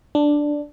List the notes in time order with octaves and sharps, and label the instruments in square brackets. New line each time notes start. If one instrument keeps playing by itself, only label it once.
[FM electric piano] D4